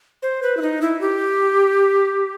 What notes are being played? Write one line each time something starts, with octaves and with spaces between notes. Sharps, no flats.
C5
B4
E4
D#4
E4
G4